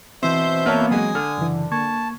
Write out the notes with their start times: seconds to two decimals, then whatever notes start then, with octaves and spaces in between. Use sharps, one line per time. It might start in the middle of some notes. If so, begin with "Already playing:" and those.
0.23 B2 E3 C4 C5 E5 G6
0.66 A#3 B3 C#5 A5 F6
0.91 F#3 G#3 G#5 D#6
1.15 D3 F6
1.38 F#2 C#3 E3
1.72 A#3 A5 C#6 G#6